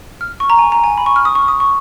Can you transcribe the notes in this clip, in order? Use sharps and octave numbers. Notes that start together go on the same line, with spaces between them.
F6
C#6
A#5
G#5
A#5
G#5
B5
C#6
F6
D#6
C#6
D#6
C#6